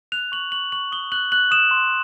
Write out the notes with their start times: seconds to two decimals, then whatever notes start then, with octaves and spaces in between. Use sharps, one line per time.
0.12 F#6 F7
0.32 C#6 F#7
0.52 C#6 F#7
0.72 C#6 F#7
0.92 D#6 G7
1.12 F#6 F#7
1.32 F#6 F#7
1.51 D#6 E7
1.71 C6